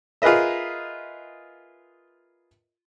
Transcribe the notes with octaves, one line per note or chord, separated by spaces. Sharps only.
F4 G#4 A#4 B4 D#5 E5